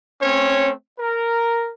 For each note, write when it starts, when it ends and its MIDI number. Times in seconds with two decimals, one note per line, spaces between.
0.22 0.72 57
0.22 0.72 60
0.22 0.72 61
0.22 0.72 73
0.98 1.70 70